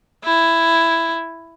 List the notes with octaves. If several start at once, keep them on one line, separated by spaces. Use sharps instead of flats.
E4